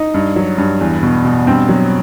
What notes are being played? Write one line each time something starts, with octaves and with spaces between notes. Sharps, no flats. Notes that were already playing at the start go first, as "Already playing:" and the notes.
Already playing: D#4 D#5
G2
F#3
G2
E2
B2
B2
G2 C4 C5
F#3